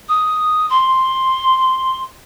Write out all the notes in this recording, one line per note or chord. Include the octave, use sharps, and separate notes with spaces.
D#6
C6